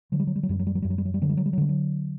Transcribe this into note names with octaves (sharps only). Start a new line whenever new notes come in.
D3 F#3
G3
F#3
G3
F#3
F#2 G3
F#3
G3
F#3
F#2 G3
F#3
G3
F#3
G3
D3 F#3
G3
F#3
G3
F#3
D3 G3
F#3